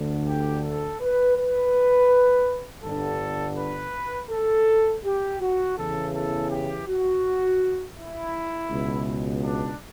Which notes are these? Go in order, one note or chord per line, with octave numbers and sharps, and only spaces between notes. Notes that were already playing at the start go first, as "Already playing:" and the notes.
Already playing: D2 D3
G4
A4
B4
B4
G1 G2 D3 A4
B4
A4
G4
F#4
E2 C#3 E3 A4
A4
G4
F#4
E4
C#2 B2
D4